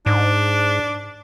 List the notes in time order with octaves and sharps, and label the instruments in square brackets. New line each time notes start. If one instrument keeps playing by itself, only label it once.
[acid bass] G#2 [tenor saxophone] D4